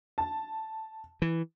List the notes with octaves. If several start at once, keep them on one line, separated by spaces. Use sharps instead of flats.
A5
E3